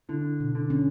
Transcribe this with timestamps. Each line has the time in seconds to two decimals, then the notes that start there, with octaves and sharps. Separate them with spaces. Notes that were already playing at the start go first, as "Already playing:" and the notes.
0.09 D3 E4
0.40 B2
0.55 D3
0.70 C#4